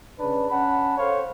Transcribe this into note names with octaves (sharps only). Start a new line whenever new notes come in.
C#3 D4 B4
C#4 F#5 A5 B5
A4 C5 C#5 F5